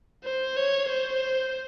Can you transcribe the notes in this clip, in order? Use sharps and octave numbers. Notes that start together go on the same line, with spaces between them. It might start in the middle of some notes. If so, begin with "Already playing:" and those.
C5
C#5
C5